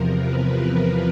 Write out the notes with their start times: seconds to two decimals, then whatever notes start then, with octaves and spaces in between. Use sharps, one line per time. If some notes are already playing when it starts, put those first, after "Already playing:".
Already playing: E2 C3 F3 A#4
0.10 B4